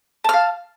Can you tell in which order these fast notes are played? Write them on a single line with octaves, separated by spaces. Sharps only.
A5 F6 F5